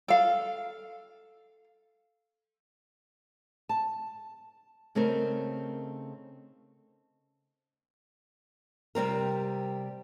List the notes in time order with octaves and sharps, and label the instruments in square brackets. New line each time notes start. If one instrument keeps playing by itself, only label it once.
[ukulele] A4 F5
[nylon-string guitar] A5
C#3 A3 C4 D#4 A#4
C3 G3 C4 A#4